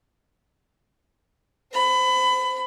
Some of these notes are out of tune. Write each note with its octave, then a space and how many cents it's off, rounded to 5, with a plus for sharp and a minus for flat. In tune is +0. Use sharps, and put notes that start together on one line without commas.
C5 -10 B5 +25